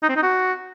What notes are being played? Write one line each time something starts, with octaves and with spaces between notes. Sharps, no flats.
D#4
C4
D#4
F#4